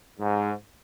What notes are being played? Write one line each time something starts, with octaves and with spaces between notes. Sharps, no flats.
G#2